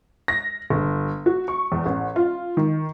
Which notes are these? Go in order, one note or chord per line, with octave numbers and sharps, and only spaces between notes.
A#6
G1
F#4
C#6
E2
A1
F4
D#3